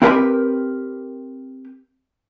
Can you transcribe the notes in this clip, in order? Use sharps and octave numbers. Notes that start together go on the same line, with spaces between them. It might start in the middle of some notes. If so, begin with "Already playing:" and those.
C4 E4 G4 A#4 B4 B5